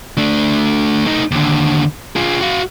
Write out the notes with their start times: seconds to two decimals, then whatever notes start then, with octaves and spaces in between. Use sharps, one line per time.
0.18 A3 D4
1.06 A3 D#4
1.31 D#2 D3
2.16 F4 G#4
2.41 F#4 F5